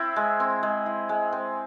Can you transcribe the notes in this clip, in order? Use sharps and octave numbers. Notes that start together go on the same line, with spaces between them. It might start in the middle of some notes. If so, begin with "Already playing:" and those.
Already playing: C4 E4
G#3
C4
G#3
E4
G#3
C4